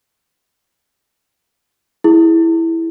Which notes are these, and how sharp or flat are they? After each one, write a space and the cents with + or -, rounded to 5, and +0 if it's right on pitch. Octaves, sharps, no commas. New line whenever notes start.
E4 +0 G#4 +0